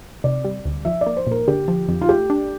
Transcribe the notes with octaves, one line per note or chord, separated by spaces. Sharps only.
C3 D5
G3
D2
F3 E5
D5
A#3
C5
A#2 A#4
D3 G4
F3
F2
F4
A3 G4
D4